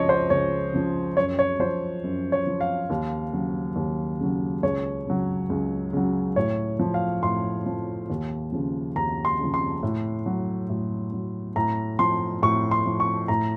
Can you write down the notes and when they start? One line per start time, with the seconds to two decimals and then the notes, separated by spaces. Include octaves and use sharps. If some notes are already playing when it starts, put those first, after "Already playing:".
Already playing: C#2 C#3 F3 C#5 D#5
0.09 C5
0.30 C#2 C#5
0.73 C#3 F3
1.17 F#2 C#5
1.39 C#5
1.59 F3 C5
2.04 F#2
2.32 C#5
2.47 F3
2.61 F5
2.90 D#2
3.33 C#3 F#3
3.76 D#2
4.20 C#3 F#3
4.62 C#2 C#5
5.06 C#3 F#3
5.50 C#2
5.93 C#3 F#3
6.36 A2 C#5
6.79 F3
6.94 F5
7.23 A2 C6
7.66 F3
8.10 D#2
8.52 C#3 F3
8.96 D#2 A#5
9.25 C6
9.39 C#3 F3
9.54 C6
9.83 A2
10.26 F#3
10.69 A2
11.12 F#3
11.56 A2 A#5
11.99 F3 C6
12.42 A2 C#6
12.71 C6
12.86 F3
13.00 C#6
13.28 A2 A#5